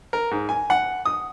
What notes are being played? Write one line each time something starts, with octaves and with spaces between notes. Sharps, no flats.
A#4
G#2
G#5
F#5
D#6